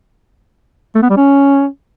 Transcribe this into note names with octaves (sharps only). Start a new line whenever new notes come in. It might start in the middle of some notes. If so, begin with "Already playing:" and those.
A3
B3
G3
C#4